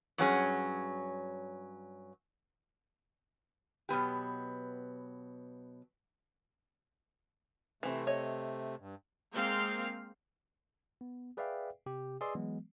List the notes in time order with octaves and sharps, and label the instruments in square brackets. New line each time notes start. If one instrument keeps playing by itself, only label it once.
[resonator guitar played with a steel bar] G2 F#3 C#4 G#4
B2 F#3 B3 G4
[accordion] C3 A3 [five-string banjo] E3 C4
[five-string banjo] C#5 D#5
[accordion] G2
[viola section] G#3 A#3 C4 F5
[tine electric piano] B3
G#4 B4 D5 E5 F5 G5
C3 G4
G#4 B4 D5 D#5 C6 E6
E3 F#3 G#3 B3